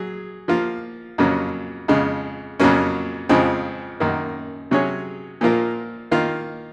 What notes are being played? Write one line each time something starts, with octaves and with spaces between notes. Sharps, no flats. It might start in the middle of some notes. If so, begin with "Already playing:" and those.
Already playing: F#3 G#4
F3 A#3 F4
F2 C#3 F#3 A#3 C#4
F2 C#3 G#3
F2 C#3 F#3 A#3 C#4
F2 C#3 F3 G#3 C4
F#2 D#3 A#3
C3 F#3 C#4 G#4 C#5
A#2 F3 A#3 F4 A#4
D#3 A#3 F4